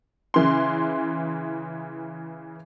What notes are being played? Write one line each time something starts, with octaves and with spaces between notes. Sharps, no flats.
C#3 E3 C6